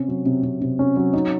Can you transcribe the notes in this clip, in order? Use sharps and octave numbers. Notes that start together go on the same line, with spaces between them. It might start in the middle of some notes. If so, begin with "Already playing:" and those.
Already playing: C3 C#4
F#3
C3
C3
C3
C#4
F#3
D#4